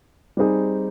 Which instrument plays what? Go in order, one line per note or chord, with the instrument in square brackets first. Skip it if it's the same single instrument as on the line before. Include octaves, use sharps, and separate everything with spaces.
[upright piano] G3 C4 D#4 G#4